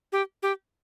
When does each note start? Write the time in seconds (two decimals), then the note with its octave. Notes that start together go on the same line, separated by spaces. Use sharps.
0.12 G4
0.43 G4